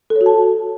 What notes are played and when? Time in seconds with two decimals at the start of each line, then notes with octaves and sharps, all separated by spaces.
0.10 A4
0.16 C#5
0.21 F#4
0.26 A5